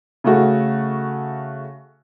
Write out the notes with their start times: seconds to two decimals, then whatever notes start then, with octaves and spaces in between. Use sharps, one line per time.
0.24 C#3 A3 F#4